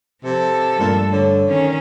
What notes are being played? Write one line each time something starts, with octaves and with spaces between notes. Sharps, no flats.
C3 F3 A4
G2 A#2 A3 D4
D3 C#5
D#3 C#4